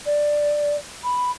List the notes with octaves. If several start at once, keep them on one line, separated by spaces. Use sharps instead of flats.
D5
B5